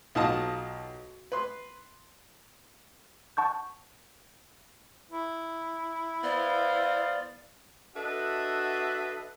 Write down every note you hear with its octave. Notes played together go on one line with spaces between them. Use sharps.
B1 D#4 F4 F5 A5 D#6
B4 C6
F#5 A5 C#6 G6
E4
B3 C5 D5 F5
D4 F#4 A4 B4 D#5 E5